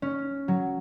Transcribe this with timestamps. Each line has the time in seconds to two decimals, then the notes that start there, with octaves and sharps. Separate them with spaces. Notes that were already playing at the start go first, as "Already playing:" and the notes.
0.02 C#4
0.48 F#3